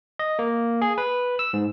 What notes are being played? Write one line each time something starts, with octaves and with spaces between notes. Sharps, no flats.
D#5
A#3
G#4
B4
E6
G#2